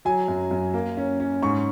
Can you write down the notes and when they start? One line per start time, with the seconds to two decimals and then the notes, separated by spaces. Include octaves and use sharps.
0.05 F#3 G#5
0.28 F#2
0.51 F#2
0.74 A#3
0.97 C#4
1.20 C#4
1.42 G#2 C#6